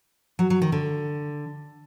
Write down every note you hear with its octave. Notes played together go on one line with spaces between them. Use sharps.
F#3
F#3
D#3
D3